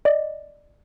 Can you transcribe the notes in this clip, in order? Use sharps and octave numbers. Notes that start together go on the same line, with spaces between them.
D5 D#5